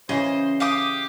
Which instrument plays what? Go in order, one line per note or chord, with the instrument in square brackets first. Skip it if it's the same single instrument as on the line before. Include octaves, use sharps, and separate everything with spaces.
[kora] C#3 E3 [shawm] C5 [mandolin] D#5
[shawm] G4 [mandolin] F5 D6 D#6